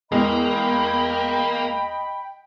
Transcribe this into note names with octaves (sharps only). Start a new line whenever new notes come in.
E2 G#3 A#3 D#5 G5 B5